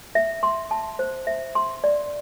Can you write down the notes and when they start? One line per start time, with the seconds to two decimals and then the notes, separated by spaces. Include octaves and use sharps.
0.15 E5
0.43 C6
0.71 A5
0.99 C5
1.27 E5
1.55 C6
1.84 D5